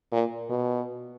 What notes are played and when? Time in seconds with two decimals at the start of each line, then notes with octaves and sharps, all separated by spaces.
0.12 A#2
0.50 B2